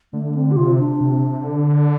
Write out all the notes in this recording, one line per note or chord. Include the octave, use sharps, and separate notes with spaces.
D3 A3
C4
G4
C3 F4
D4
C3
D3